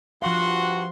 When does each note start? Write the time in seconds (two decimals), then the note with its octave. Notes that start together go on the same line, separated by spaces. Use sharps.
0.22 G2 F3 F#4 F5 C6